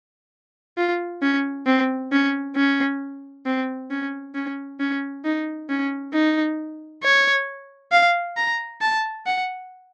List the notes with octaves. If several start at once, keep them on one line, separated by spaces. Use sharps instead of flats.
F4
C#4
C4
C#4
C#4
C4
C#4
C#4
C#4
D#4
C#4
D#4
C#5
F5
A#5
A5
F#5